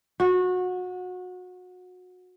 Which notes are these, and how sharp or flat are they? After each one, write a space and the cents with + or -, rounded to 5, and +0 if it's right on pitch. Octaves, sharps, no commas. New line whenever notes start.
F#4 -25